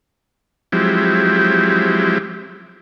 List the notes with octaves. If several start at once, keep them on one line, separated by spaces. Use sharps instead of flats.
F3 F#3 G#3 C4 E4 G4